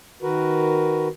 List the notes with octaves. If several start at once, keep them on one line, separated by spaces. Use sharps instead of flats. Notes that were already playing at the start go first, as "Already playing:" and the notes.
D#3 F#4 A#4 B4